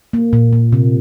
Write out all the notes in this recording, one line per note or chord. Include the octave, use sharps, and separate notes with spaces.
A#3
A#2
A#2
C3